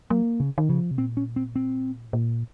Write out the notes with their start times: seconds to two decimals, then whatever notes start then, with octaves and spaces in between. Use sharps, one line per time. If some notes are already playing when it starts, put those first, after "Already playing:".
0.10 F#3 A#3
0.40 C#3
0.58 D#3
0.69 C#3 F3
0.91 C3
0.98 A#2 C4
1.17 C#4
1.36 C4
1.56 C4
2.08 A2
2.13 A#2